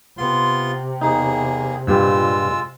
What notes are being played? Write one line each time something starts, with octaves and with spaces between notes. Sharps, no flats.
C3 B3 F4 C6
E2 A#3 D#4 G#4
G2 A#2 G3 G#3 F4 E6